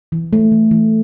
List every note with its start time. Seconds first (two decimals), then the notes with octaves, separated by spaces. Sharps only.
0.12 E3
0.33 A3
0.52 E3
0.71 E3